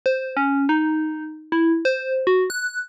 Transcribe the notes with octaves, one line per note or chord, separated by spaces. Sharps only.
C5
C#4
D#4
E4
C5
F#4
F#6